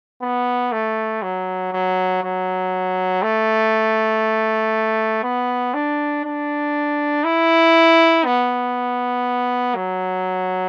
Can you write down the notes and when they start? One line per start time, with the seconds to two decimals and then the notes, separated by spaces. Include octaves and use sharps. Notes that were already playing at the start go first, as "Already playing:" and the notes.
0.22 B3
0.72 A3
1.23 F#3
1.73 F#3
2.23 F#3
3.23 A3
5.24 B3
5.74 D4
6.24 D4
7.24 E4
8.25 B3
9.76 F#3